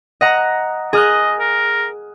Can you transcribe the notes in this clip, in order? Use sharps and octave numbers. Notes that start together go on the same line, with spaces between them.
D#5 F#5 A#5
G#4 D#5 F6 F#6
A#4